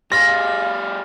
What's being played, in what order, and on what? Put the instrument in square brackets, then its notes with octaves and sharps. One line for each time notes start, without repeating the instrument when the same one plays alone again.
[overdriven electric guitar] G3 G#4 [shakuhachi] F5 [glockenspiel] C6 F6 A6 [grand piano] A#6